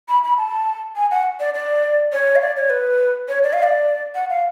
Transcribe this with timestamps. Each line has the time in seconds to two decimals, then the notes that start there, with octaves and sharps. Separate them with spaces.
0.09 B5
0.24 B5
0.38 A5
0.96 G#5
1.11 F#5
1.40 D5
1.54 D5
2.13 C#5
2.36 F5
2.41 D5
2.57 C#5
2.70 B4
3.29 C#5
3.43 D5
3.53 F5
3.63 D5
4.15 F#5
4.30 F5